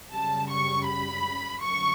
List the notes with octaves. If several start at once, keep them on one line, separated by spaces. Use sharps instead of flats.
F#2 C#3 G3 A5
C#6
B5
G1 F#2 C#6